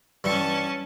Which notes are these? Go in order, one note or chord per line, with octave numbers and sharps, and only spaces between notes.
G2 E3 C#4 A5 C#6